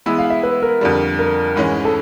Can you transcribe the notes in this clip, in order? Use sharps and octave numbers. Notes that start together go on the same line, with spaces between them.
E3 G#3 B3 E4
F5
E5
B4
A#4
F2 D3 G3
A#4
G#2 E3 G#3 C#4
A4